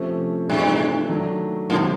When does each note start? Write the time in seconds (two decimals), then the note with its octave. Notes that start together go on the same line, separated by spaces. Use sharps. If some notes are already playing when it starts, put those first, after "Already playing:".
Already playing: C3 F3 A3 C#4
0.48 G2 C3 E3 A3 D4 F4
1.09 D#3 F#3 A3 D4
1.70 G#2 C3 D#3 F#3 A#3